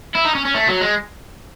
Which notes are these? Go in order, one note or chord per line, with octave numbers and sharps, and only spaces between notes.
E4
D#4
C#4
C#4
A3
F#3
G#3